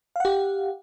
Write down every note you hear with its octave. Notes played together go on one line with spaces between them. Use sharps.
G4 F5 F#5